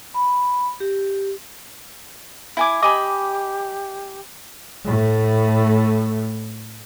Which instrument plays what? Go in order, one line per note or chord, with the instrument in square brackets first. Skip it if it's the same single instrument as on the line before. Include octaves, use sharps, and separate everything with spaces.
[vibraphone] B5
G4
[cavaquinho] E4 G#5 D6
[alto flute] G4 [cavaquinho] D#5 G#5 B5 [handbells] D6
[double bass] A2 A3